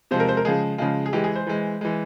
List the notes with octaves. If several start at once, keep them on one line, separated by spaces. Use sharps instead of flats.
C3 F3 G#3 C5
A#4
C5
A#4
C#3 F3 G#3 G#4
C#3 F3 G#3 F4
G#4
E3 G#3 G4
G#4
C5
E3 G#3
E3 G#3